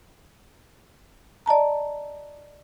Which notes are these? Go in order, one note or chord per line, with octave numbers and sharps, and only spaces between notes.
D5 D#5 A5 A#5